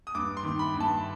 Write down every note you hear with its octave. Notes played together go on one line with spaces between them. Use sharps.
D#6
G2 D6
C6
D#3
B5
G2
A5